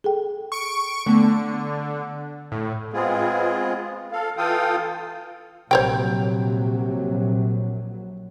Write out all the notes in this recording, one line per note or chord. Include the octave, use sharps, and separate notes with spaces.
G#4 A4 G5
C#6 D7
D3 A3 B3
A2
G#3 B3 C4 F4 G#4
A4 F5
E3 F4 A4 F5 G5 D#6
A#1 C3 F#3 C5 C#5 G5